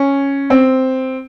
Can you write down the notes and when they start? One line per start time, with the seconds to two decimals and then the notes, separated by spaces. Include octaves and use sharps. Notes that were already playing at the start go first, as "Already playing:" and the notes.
Already playing: C#4
0.50 C4